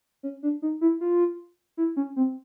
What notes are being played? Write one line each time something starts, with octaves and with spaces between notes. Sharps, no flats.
C#4
D4
D#4
E4
F4
E4
C#4
C4